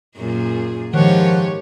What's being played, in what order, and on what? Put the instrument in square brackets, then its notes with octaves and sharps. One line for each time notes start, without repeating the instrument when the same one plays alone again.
[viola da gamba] F#2 A#2 G#4 [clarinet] F4
[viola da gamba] G#2 G4 C#5 [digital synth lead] D#3 [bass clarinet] F3 [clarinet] F#5